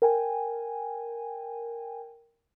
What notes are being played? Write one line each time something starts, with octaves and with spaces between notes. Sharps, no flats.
A#4 G5 G#5